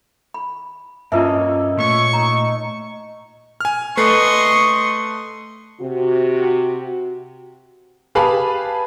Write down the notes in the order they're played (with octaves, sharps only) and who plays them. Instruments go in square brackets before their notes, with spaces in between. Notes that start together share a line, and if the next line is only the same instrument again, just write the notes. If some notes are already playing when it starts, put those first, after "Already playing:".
[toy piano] B5
[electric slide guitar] G2 C#4 [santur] A#3 A4 D#5 [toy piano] F4 B4 E5
[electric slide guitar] A#2 A3 [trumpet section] C#5 C#6
[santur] D#4 [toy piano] A#5
[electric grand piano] G#5 F6
[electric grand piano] A3 B4 C7 [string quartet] D#5 C6 C#6
[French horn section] C3 F#4
[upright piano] G4 G#4 B4 F5 A5 B5